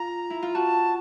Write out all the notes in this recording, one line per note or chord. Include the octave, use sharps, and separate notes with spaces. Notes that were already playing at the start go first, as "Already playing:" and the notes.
Already playing: F4 A#5
E4
F4
F#4 A5